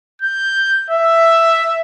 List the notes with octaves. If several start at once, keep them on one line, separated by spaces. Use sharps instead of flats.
G6
E5